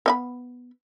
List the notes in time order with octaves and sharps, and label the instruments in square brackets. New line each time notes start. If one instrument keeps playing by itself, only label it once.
[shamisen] B3 D#5 B5